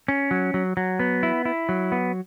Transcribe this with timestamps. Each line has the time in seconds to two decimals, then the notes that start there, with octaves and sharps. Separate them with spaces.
0.08 C#4
0.31 F#3
0.54 F#3
0.77 F#3
0.99 B3
1.23 E4
1.45 E4
1.69 F#3
1.92 B3